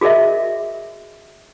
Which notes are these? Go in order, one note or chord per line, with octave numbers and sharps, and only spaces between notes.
F#4 G#4 A#4 D#5 E5